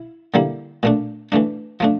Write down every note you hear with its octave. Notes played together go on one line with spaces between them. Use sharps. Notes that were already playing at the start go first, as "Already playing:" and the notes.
Already playing: E4
D3 G3 A#3 E4
A#2 A3 D4
E3 A3 D4
F3 A3 D4